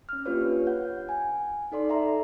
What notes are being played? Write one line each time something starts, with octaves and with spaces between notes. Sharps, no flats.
C#4 F6
A#3 D4 F4 G4 B4 C#5
F#5 G6
G#5
D#4 A4 D5 C6
A4 E5 A#5 C6